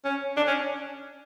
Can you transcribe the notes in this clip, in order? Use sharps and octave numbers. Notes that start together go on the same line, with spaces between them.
C#4
D4
C#4